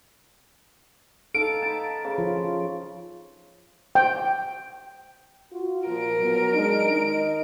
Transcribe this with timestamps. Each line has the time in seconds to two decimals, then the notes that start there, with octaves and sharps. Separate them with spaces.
1.35 D#4 A4 F5 D7
1.62 A5 B5
2.04 C#3
2.18 F3 F4
3.95 G5
5.53 F4 F#4
5.87 A#2 F3 A#4 D7
6.19 B2 F#3
6.53 G#3 D4 D#4
6.93 D#3 D#4 D#5